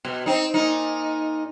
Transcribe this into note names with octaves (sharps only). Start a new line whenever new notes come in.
B2
C4 D#4
A#2 D#4